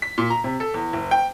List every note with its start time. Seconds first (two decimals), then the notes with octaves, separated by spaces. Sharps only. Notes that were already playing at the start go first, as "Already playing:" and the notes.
0.02 B6
0.18 A#2
0.30 A#5
0.44 C3
0.60 A4
0.74 E2
0.93 F#1
1.11 G5